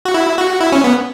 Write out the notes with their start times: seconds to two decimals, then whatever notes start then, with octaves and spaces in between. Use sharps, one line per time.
0.05 F#4
0.14 E4
0.38 F#4
0.61 E4
0.72 C#4
0.84 B3